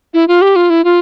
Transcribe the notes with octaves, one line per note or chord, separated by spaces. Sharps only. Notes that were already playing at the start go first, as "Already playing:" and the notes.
E4
F4
G4
F4
E4
F4